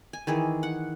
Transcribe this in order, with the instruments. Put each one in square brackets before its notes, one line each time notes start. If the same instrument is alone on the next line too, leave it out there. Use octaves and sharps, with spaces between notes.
[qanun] G#5
D#3 E3 G#4
F#5